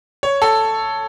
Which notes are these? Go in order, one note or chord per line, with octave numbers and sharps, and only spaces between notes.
C#5
A4